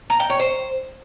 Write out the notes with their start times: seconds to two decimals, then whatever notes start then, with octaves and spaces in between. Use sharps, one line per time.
0.10 A#5
0.20 G5
0.30 C#5
0.40 C5